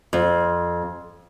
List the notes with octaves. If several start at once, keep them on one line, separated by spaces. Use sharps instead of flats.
F2